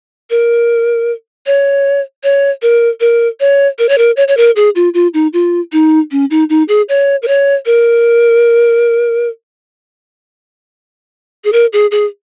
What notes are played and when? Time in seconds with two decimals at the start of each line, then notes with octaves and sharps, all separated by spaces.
0.30 A#4
1.46 C#5
2.24 C#5
2.62 A#4
3.00 A#4
3.40 C#5
3.79 A#4
3.89 C#5
3.98 A#4
4.17 C#5
4.28 C#5
4.37 A#4
4.56 G#4
4.75 F4
4.94 F4
5.14 D#4
5.33 F4
5.72 D#4
6.11 C#4
6.31 D#4
6.50 D#4
6.68 G#4
6.89 C#5
7.23 A#4
7.28 C#5
7.66 A#4
11.45 G#4
11.52 A#4
11.73 G#4
11.91 G#4